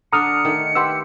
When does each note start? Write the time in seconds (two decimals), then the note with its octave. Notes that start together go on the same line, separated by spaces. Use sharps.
0.12 D3 D4 A#5 D#6 F6 C#7
0.45 D#3 A3
0.75 G4 B4 F#5 C6 E6